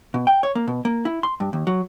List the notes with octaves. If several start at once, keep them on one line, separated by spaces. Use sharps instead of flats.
B2
G5
C#5
A#3
B2
A#3
E4
C6
G2
D#2
F#3